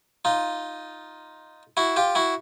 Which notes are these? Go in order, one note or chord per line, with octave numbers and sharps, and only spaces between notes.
D#4 F4
E4 F#4
F4 G4
E4 F#4